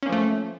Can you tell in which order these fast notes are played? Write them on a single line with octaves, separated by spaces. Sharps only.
C#4 A#3 F3 A3